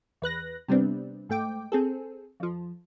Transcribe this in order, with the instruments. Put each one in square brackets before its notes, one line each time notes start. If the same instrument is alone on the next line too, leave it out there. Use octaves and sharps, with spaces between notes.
[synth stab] E2 B4 F#6 A#6
C3 G3 B3 C4 D4
G#2 A3 G5 D6
C4 G#4 A4
F2 F3